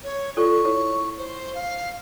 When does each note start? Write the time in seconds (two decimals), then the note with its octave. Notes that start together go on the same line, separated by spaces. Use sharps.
0.04 C#5
0.37 F4 A4 D5 C#6
0.65 E4 C#5
1.18 C5
1.55 F5